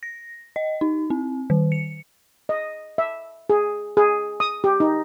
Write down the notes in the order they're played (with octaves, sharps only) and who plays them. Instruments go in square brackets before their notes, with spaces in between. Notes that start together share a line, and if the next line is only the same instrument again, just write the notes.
[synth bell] A#6
D#5
D#4
C4
D#3
C#7
[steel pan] D#5
E5
G#4
G#4
D#6
G4
D#4